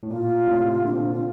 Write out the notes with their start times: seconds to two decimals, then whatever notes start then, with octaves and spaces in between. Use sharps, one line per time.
0.03 A2
0.10 A#2 F4
0.48 A2 C3
0.84 A#2 D3 D4
0.93 C4
1.03 D4
1.13 F4